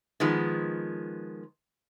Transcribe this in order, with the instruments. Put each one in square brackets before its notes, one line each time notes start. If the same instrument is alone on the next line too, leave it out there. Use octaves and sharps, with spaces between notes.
[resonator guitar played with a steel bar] D#3 F3 G#3 B3